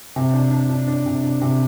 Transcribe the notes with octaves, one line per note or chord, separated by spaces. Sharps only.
C3
D4
D4
D4
D4
C3
D4
C3